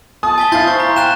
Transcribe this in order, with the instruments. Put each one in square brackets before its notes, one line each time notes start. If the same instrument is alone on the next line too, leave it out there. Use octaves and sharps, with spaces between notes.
[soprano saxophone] A5 [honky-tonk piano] D#6
[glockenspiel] G#5 B6 G7
[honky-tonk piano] E4 F5 [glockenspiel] C6 G6 A6
[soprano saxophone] C5 [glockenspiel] C#6
[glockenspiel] A#5
[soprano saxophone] F5 [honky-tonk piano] G5 [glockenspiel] F#6 E7